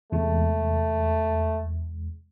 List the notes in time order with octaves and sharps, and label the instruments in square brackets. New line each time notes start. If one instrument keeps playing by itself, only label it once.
[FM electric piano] E2 C3 G#3 [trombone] A3